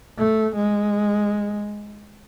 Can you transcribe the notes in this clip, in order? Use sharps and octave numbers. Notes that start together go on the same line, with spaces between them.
A3
G#3